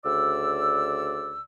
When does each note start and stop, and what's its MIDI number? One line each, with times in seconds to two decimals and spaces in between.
0.05 1.41 38
0.05 1.41 49
0.05 1.41 74
0.05 1.41 88